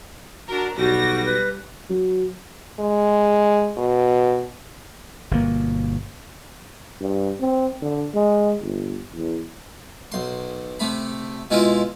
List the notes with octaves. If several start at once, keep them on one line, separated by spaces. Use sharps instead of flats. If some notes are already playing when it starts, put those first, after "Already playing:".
D4 F#4 A#4
B1 G3 F#4 A#6
B4
F#3
G#3
B2
G1 B2 A#3
G2
C4
D3
G#3
G1
E2
B1 C6
C3 A3 B5
B2 G#3 E4 F4